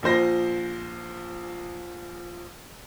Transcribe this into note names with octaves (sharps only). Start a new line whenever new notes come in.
A#1 F3 C5 A#6